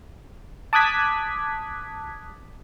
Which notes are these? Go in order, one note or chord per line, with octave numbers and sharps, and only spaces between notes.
A5 D6 D#6 F#6 G#6 B6